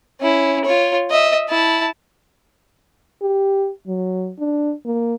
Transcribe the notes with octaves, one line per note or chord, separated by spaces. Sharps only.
C#4 E4
F4 C#5
D#5 E5
E4 A5
G4
F#3
D4
A#3